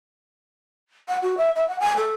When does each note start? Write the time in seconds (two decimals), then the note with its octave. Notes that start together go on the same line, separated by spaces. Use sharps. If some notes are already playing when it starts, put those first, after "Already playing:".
1.08 F#5
1.22 F#4
1.38 E5
1.56 E5
1.68 F#5
1.80 G#5
1.97 A4